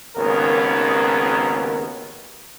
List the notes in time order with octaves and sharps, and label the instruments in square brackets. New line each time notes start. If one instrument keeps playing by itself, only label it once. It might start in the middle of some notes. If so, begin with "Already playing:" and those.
[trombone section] G#1 D#2 C#3 B3 A#4